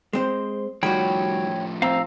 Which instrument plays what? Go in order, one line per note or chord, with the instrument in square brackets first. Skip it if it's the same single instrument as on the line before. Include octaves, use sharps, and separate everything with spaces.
[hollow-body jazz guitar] G#3 C4 C5
[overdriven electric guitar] A2 F3 [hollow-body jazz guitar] D#3 G3 F#4 [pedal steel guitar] C#5 G5 B5
[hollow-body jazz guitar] C4 [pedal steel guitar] F5 A#5 E6